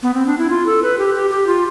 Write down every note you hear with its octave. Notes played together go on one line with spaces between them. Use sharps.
B3
C4
D4
E4
F4
A4
B4
G4
G4
G4
F4